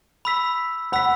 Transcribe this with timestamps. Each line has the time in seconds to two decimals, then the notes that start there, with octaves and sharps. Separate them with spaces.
0.25 B5 E6 B6
0.92 F#5 B5 E6 B6